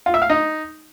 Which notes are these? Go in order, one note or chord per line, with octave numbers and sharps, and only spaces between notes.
F4
E5
F5
D#4